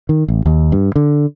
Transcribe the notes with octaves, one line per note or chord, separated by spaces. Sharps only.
D#3
A1
D#2
G2
D3